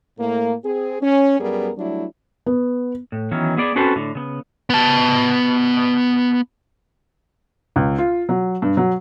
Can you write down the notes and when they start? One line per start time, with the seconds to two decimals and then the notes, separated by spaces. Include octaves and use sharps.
0.18 A2 A#3
0.63 C4 G#4
1.01 C#4
1.39 F#2 G3 B3 G#4 A#4
1.78 F#3 G3 A3 D4 E4
2.46 B3
3.12 A2
3.31 D#3 E3 F#3 B3 C#4
3.57 B3 G#4 D5
3.76 C4 C#4 F#4 A4 B4 C5
3.96 A2 D3
4.15 C#3 B3
4.70 B3 A5
7.76 C#2
7.98 F4
8.29 F#3
8.62 G2
8.77 F#3